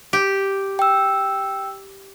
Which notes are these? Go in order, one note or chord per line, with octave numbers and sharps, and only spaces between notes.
G4
G5 E6